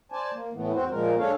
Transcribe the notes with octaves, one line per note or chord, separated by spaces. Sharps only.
C5 D5 G#5 A5
A#3
A2 E3 A3 B3
E2 C4 F#4 C5
A#2 F3 G#3 A#4
G#3 D4 A4 C#5 F5